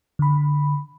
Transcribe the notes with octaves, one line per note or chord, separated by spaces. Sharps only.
D3 B5